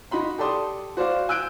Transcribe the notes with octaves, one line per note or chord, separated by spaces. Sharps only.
D#4 F#4 B5 C6
G4 A4 D5 A5 C6 D#6
F#4 C5 D5 F5
G#5 E6 F#6 G6 D7